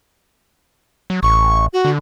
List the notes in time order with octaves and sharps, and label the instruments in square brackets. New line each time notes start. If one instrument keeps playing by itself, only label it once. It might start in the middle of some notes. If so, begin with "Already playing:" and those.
[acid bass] F#3
[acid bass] A1 [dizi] C#6
[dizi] F#4
[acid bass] D3